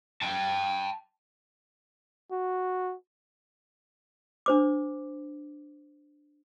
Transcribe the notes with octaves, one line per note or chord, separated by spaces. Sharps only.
G5 A5
F#4
D4 C5 D6